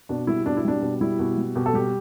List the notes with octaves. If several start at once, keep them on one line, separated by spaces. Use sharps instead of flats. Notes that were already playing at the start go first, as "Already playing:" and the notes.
B2 D4
G3 E4
B2 D4
E4
G3 D4
B2
G3 E4
B2
G3
B2 G4
A4
G3 G4